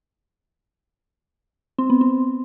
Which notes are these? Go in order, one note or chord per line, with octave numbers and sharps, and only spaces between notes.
C4
B3
C4